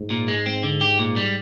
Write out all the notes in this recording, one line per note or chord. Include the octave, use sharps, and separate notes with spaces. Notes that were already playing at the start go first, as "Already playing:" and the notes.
Already playing: G#2
A#2
G#3
C4
D3
G4
A#2
G3